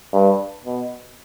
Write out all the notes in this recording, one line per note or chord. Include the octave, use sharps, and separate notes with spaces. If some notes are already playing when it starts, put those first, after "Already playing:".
G2
B2